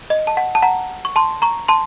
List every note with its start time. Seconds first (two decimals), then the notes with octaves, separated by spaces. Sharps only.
0.10 D#5
0.27 A5
0.37 F#5
0.55 A5
0.62 F#5 A#5
1.05 C#6
1.16 A5 C6
1.42 A#5 C#6
1.68 A5 C6